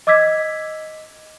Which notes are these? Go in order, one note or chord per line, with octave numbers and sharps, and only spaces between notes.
D#5 D6 E6 G#6 B6